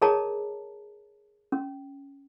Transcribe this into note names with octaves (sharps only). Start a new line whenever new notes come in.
G#4 A#4 C#5 D#5 A5 A#5
C#4